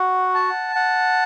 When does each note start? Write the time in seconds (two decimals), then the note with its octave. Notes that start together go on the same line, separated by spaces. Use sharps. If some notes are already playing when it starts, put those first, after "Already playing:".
Already playing: F#4 F#5
0.34 A5
0.76 F#5